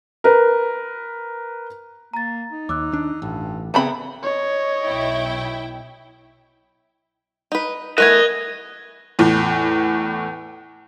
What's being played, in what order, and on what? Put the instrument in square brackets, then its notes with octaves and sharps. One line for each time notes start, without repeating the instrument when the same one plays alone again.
[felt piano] A#4 B4
[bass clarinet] A#3 [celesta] A#5 A6
[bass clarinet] D#4
[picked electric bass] D#2 [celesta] D6 E6 F#6
[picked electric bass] D#2 D4
[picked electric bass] A1 [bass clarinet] G2
[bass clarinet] C#3 [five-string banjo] B3 C4 B5 [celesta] E5 A#5
[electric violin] C#5 D#5
[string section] B1 E4 G5
[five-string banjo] D#4 B4
[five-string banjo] E3 A3 B3 [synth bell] A#4 [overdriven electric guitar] D#5 [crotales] F#6 G#6
[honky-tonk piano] E2 A2